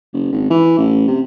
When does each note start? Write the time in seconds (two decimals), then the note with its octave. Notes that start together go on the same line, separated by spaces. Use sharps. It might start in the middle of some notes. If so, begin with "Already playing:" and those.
0.13 F#1
0.32 G#1
0.50 E3
0.78 A1
1.07 C3